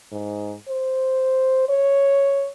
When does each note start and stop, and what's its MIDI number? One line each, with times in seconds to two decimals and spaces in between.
0.12 0.54 44
0.68 1.66 72
1.69 2.51 73